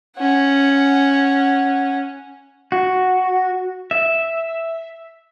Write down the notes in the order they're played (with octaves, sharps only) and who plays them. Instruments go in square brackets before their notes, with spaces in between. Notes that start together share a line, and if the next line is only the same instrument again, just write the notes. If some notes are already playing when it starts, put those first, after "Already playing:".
[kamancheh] C#4 F#5
[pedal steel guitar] F#4
E5